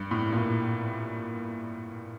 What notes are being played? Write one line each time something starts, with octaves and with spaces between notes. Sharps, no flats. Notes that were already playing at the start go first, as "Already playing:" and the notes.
Already playing: G2
A2
A#2
A2